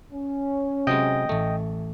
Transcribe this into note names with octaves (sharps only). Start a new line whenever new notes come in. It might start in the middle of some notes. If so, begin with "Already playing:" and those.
C#4
C3 F#3 G#3 D#5 G5
A1 A3